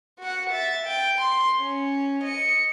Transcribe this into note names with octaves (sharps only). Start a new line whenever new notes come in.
F#4 F#5
E5 A6
G5
C6
C#4
D#5 C#7